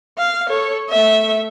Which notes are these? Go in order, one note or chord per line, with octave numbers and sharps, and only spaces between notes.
F5
A4 C#5
A3 E5